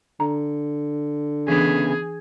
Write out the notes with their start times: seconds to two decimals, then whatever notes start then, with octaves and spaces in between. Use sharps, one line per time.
0.20 D3 A#5
1.48 C#3 E3 B3 D4 G#4